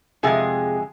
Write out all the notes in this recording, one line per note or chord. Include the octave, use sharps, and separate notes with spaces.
F2 C3 G#3 G#4